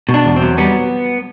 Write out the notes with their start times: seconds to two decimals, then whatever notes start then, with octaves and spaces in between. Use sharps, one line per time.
0.09 B2
0.14 D4
0.25 E2
0.36 C4
0.42 F#3
0.58 G3 B3